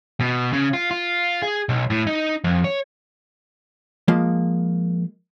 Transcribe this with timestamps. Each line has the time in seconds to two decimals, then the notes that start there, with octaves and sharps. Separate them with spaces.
0.20 B2
0.53 C#3
0.74 F4
0.91 F4
1.42 G#4
1.69 B1
1.90 A2
2.07 D#4
2.44 F2
2.64 C#5
4.08 F3 G#3 A#3